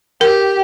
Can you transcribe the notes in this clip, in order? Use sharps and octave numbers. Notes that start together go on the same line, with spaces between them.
G4 A#4